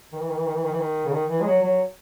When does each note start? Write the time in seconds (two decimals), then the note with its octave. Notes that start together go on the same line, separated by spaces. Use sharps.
0.13 D#3
0.21 E3
0.29 D#3
0.37 E3
0.47 D#3
0.55 E3
0.63 D#3
0.72 E3
0.79 D#3
1.06 C#3
1.12 D#3
1.29 E3
1.41 G#3
1.46 F#3
1.63 F#3